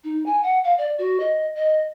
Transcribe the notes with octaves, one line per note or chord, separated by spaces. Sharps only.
D#4
G#5
F#5
F5
D5
F#4
D#5
D#5